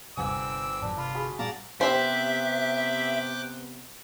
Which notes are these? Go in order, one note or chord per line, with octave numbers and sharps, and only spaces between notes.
G1 C3 G3 C4 F#5 G#5 D6 E6
F2 G#2 F#3 D4
C3 F4 B5
F#4 G#4 B5
A#2 G3 B3 D5 F5 A5 A#5
C3 B3 G4 C5 E5 G5 D6 F#6